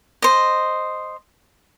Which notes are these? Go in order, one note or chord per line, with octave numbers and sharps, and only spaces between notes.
C5 D#5